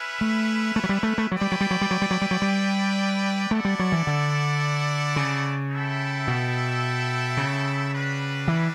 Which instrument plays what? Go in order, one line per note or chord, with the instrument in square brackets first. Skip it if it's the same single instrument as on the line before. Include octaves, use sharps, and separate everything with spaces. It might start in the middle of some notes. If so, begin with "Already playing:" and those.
Already playing: [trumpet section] C#4 E4 B4 E5
[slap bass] A3
A3
F#3
G3
A3
A3
[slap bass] F#3 [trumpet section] E4 B4 D5 G5
[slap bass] G3
F#3
G3
F#3
G3
F#3
G3
F#3
G3
F#3
G3
[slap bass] A3 [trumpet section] E4 A4 D5 F#5
[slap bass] G3
F#3
E3
D3
C#3
[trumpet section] E4 A4 E5 G5
[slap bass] B2
C#3
[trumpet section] G3 D4 F#4 B4
[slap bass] E3